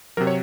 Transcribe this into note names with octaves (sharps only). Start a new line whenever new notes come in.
C3 F#3 A#4
C#5